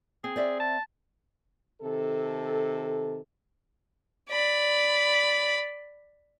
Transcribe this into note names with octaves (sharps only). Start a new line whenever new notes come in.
C4 G#4
C4 D5 E5
A5
C3 D#3 A4
D5 B5